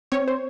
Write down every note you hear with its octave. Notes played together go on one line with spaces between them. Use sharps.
C4 C#5
C5